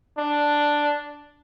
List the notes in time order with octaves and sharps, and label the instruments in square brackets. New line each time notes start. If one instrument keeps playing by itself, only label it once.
[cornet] D4